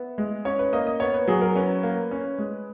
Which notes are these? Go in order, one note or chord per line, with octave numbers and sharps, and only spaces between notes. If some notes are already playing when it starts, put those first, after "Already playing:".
Already playing: B3 E5
G#3
C#4 C#5
B4
A#3 D#5
D#5
B3 C#5
B4
F#3 G#4
A#4
C#4 B4
A#3
C#4
G#3